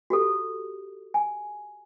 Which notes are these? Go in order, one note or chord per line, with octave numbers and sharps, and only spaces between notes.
F#4 G4 A4
G#5